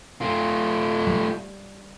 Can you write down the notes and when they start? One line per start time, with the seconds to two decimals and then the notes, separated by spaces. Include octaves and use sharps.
0.21 A3 F4
1.07 G3